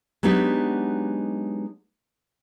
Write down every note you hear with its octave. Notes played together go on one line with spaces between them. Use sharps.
F#3 G#3 B3 D4 D#4 G4